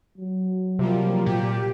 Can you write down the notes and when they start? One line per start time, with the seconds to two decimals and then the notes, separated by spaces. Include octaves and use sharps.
0.18 F#3
0.79 C3 F3 G3 A#3
1.26 A#2 G4